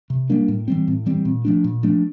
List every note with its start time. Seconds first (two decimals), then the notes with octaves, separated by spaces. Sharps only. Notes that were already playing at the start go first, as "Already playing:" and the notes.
0.10 C3
0.30 G3 A#3 D4
0.48 A2
0.68 E3 G3 C4
0.88 A2
1.06 E3 G3 C4
1.25 A#2
1.45 F3 A3 D4
1.64 A#2
1.83 F3 A3 D4